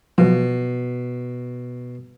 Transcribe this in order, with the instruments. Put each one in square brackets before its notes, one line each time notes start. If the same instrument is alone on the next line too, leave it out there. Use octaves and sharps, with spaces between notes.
[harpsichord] B2 [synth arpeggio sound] F3 F#3